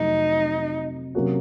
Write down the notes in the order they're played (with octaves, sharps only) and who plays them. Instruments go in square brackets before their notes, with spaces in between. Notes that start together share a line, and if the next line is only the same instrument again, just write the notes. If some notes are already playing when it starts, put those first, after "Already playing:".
Already playing: [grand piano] F2 C3 F#3 A3 [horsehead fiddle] D#4
[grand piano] C3 F#3 A#3 C#4 F#4